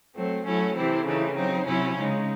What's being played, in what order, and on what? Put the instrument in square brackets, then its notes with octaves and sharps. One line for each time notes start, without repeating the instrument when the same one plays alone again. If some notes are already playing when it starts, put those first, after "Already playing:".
[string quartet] F#3 A3 C4
F#3 A3 C#4 E4
C3 E3 C4 E4
C#3 E3 A3 D#4
F#3 C4 D#4
C3 F#3 C#4 E4
C#3 G#3 D#4